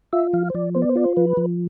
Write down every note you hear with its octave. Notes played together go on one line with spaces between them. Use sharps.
F4 E5
F3 F5
C5
F3 D5
B3 C5
D5
C5
F4 D5
C5
F3 B4
F3